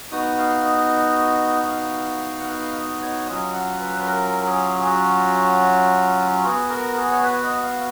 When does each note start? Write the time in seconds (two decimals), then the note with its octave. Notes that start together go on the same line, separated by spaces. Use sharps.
0.11 B3 D#4 F#4 D#6
0.38 F5
0.65 D#5
1.60 D#5
1.69 F5
2.38 F#5
2.49 F5
2.75 D#5
3.02 C#5
3.27 F#3 C#4 F4 D#5
3.53 F#5
3.80 B4
4.00 B4
4.06 A#4
4.46 G#4
4.79 G#4
4.85 F#4
6.44 B3 F#4 G#4
6.70 A#4
6.97 G#4
7.11 C#5
7.23 B4
7.43 D#5
7.63 F5